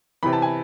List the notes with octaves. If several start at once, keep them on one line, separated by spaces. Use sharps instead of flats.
C3 E3 B5
A5
G#5